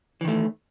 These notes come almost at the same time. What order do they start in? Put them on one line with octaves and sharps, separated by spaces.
E3 D#3 A3